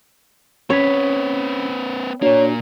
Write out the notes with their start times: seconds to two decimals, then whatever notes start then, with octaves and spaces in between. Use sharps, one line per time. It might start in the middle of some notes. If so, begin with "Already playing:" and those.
0.70 C4 C#4 B4 C#5 B6
2.22 A#2 A#3 D4 F#4 C#5 D5